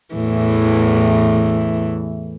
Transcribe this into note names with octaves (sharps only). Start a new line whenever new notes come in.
E2 A2 E3